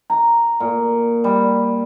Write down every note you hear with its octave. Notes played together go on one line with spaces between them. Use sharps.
A#5
A#2
G3